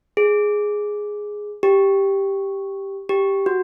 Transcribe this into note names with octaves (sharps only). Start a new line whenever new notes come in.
G#4
G4
G4
F#4